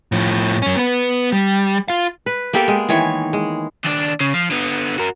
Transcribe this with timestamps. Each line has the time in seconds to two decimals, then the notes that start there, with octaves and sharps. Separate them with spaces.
0.12 A2 F3
0.62 F#2 C#4
0.76 B3 B4
1.32 G3
1.88 F4 F5
2.26 B4
2.53 A#3 B3 G4 A4
2.68 G#3
2.89 D#3 E3 C#5
3.33 G#3
3.85 D#2 D4
4.20 C#3
4.34 F3
4.51 D3 B3
4.98 F#4 A#4